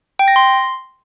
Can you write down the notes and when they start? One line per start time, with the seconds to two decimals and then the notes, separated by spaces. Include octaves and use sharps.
0.19 G5
0.28 A#6
0.36 C6